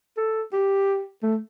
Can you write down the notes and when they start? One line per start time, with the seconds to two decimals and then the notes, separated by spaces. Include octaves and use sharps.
0.17 A4
0.53 G4
1.23 A3